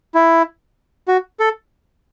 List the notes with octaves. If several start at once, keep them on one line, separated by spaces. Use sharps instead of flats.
E4
F#4
A4